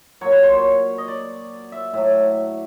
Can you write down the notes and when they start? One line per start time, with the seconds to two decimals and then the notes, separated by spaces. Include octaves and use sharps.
0.21 A#2 F#3 C#5
0.32 B4
0.43 C5
0.54 C#5
0.98 D#5
1.08 D5
1.72 E5
1.93 A2 F#3 E5